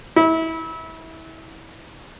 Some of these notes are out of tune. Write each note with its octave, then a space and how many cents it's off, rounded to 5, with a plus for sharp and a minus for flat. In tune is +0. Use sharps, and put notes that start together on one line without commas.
E4 -25